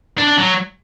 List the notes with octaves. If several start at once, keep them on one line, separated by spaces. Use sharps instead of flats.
D4
D4
F#3